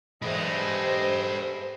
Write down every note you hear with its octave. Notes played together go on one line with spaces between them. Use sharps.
E2 G#3 A3 G4 B4 C5 D#5